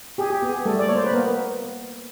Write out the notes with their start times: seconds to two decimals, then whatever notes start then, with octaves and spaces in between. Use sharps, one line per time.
0.18 G4 G#4
0.30 G4
0.42 B3 G#4
0.66 G3 A3 A4
0.79 D5
0.88 A#3 C#5
0.96 C5
1.04 B4
1.11 A#3 B3 A#4